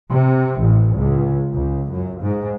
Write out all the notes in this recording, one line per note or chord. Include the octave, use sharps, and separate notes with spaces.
C3
A1
C#2
C#2
F#2
G#2